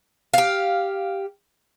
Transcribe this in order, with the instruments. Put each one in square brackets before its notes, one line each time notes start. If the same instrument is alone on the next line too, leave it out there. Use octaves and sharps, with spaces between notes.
[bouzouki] G4 F5